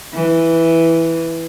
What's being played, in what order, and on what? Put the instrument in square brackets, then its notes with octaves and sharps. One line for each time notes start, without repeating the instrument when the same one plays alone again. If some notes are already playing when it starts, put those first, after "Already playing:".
[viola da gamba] E3